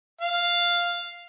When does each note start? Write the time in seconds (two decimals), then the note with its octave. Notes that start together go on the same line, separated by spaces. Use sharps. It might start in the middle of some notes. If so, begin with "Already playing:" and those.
0.21 F5